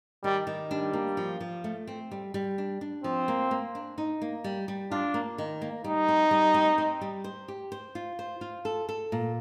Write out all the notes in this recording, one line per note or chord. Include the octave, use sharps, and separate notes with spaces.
D#3 G3
D#3
G3 D4
A#3
F3
F3
A3
C4
G3
G3
D4
D4
F3 C4
A#3
A#3
D4
D#4
A#3
G3
G3
D4 F4
A#3
D#3
A#3
G3 D#4
C4
G3
C4
C4
G3
C5
G4
C5
F4
C5
F4
A4
A4
A#2